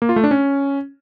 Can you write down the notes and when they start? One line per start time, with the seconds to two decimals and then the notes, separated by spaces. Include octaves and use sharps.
0.02 A#3
0.09 F4
0.16 A3
0.24 D4
0.31 C#4